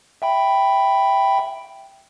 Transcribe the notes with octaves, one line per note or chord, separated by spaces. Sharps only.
E5 G5 B5